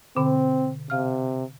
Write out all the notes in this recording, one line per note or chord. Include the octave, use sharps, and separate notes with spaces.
B2 D3 C4
C3 F5 F6